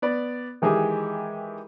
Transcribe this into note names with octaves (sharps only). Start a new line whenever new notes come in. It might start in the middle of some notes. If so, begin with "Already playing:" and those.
B3 D5
D#3 E3 G#3 G4 G#4